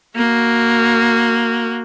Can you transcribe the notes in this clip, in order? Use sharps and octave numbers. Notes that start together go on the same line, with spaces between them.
A#3 F#4